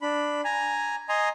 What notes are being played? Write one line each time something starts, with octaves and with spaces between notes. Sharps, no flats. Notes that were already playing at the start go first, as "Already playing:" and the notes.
D4 B5
G#5 A#5
D#5 G#5 A#5 C6